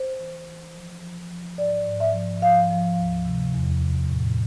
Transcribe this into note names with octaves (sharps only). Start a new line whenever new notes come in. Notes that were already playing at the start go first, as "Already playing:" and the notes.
Already playing: C5
E3
E3
F3
F3
F3
G#2 D5
G#2
E5
F3
F3 F5
F3
D2
C3
E2
C3
A2